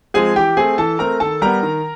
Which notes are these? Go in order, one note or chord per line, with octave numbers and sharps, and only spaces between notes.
F3 G#3 C4 G#4 G#5
E3 G4 G5
A3 C4 G#4 G#5
E3 A4 A5
A3 C4 A#4 A#5
D#3 A4 A5
G3 B3 A#4 A#5
D#3